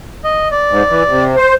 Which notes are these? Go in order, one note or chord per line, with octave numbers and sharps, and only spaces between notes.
D#5
D5
G#2
E3
C3
C5